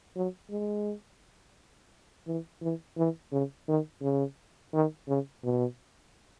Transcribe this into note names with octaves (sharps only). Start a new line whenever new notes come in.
F#3
G#3
E3
E3
E3
C#3
D#3
C#3
D#3
C#3
B2